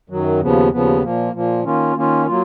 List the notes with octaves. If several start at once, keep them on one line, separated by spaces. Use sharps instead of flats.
F#2 D#3 F#3
D#2 C#3 F3 B3
D#2 C#3 F3 B3
A#2 F3 A#3
A#2 F3 A#3
D#3 A#3 C#4 F4
D#3 A#3 C#4 F4
F#3 A#3 F4